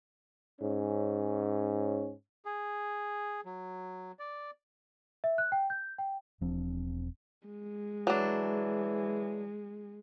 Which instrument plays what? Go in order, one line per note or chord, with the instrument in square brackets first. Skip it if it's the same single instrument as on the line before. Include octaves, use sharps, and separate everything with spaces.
[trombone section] G#2 C#4
[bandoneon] G#4
F#3
D5
[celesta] E5
F#6
G5
G6
G5
[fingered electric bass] E1 F3 C4 D4
[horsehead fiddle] G#3
[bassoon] E3 [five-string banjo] F#3 D4